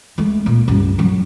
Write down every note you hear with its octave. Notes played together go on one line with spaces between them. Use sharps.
G#3 A3
A#2 A#3
C#2 G2
A2 F#3